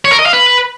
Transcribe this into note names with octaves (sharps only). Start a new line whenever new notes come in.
C#5
A#4
D#5
F5
B4